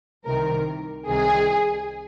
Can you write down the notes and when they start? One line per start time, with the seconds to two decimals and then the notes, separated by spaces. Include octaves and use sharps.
0.25 C2 C3 D#3 A#4
1.06 C2 C3 D#3 G#4